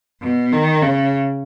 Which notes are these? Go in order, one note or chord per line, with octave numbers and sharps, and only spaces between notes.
B2
D#3
C#3